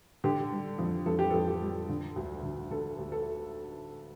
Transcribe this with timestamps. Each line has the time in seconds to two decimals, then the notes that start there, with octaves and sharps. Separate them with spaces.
0.24 D3 G4
0.52 G3
0.79 F2
1.06 F2 A4
1.19 G4
1.30 F2 A4
1.48 G4
1.61 G3
1.89 D3
2.16 D2
2.43 D3
2.71 D3 A4
2.98 D2
3.12 A4